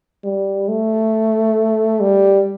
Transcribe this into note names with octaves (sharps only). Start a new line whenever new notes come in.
G3
A3
G3